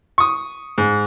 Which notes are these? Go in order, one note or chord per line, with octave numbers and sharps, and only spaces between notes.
C#6 D#6
G#2